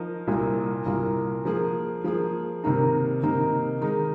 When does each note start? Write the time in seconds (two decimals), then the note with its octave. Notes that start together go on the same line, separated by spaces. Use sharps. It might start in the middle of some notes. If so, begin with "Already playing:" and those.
Already playing: F3 D#4 A#4
0.28 C2 A#2 A#3
0.86 C2 A#2 A#3
1.45 F3 A#3 G#4
2.04 F3 A#3 G#4
2.64 C3 D#3 A#3 D#4
3.23 C3 D#3 A#3 D#4
3.81 D#3 G#3 D#4